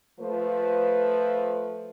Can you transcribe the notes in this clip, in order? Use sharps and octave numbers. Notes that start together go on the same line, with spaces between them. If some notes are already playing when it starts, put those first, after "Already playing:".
F3 A3 B4